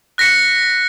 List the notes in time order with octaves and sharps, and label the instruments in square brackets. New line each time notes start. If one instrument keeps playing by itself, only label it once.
[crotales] F#6 A#6 B6 C#7